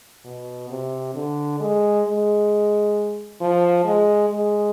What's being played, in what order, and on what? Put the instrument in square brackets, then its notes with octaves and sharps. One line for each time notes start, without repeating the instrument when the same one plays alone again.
[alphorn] B2
C3
D3
G#3
G#3
F3
G#3
G#3